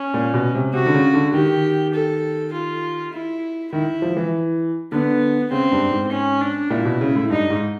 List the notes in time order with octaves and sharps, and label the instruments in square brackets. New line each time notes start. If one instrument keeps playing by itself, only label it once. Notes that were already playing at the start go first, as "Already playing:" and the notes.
Already playing: [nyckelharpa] C#4
[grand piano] A#2
B2
C3
[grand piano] C3 [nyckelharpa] F#4
[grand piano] D3
C#3
D3
[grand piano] D#3 [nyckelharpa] G4
[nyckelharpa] A4
F4
E4
[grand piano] D#3 [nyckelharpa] E4
[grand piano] F3
E3
[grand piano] D3 [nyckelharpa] B3
[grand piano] C#3 [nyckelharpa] C4
[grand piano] G2
G#2
[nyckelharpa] C#4
D4
[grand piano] A#2 [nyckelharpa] E4
[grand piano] B2
C#3
A2
[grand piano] G2 [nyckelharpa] D#4
[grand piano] G#2